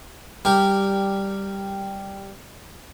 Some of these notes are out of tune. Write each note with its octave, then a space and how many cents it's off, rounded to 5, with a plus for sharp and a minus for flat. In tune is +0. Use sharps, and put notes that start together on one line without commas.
G3 +0 G4 +0 A#4 -15